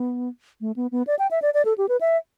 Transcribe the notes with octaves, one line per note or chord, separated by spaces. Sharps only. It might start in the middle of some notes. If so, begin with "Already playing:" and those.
Already playing: B3
A3
B3
B3
D5
G5
E5
D5
D5
A4
G4
B4
E5